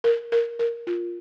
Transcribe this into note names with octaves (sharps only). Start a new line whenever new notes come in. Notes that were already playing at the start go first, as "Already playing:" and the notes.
A#4
A#4
A#4
F4